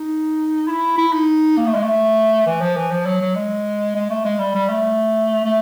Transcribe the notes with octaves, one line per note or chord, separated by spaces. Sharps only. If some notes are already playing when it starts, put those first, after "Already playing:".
Already playing: D#4
E4
E4
D#4
A#3
A3
G#3
A3
E3
F3
E3
F3
F#3
F#3
G#3
G#3
A3
G#3
G3
G3
A3
A3